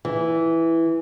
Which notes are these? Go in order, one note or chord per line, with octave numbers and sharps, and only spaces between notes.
E3